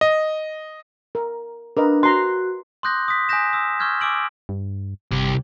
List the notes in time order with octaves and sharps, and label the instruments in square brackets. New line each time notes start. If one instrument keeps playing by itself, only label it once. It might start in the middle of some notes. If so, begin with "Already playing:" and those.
[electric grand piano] D#5
[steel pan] A#4
[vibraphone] D4 [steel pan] A#4 B4 D#5
[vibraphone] F#4 [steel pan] A#5 C6
[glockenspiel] C6 D6 D#6 F#6 G6 A#6
D#6 B6
G#5 D#6 F#6 G6 A#6 E7
D#6 E6
C#6 E6 F6 G6 G#6
G#5 D6 E6 D7 F#7
[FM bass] G2
[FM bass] G1 [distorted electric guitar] C2 G4